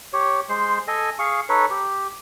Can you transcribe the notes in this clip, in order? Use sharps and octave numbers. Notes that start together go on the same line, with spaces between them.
G4 C#5
G#3 C5 C6
A4 D#5 G#5
G#4 F5 C#6
D#4 A4 B4 C#5
G4